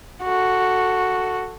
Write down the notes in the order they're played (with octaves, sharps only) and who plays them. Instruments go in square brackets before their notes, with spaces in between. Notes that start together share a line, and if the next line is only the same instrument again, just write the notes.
[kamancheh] F#4 A4